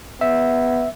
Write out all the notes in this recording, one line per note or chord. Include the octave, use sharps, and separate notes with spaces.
B3 E5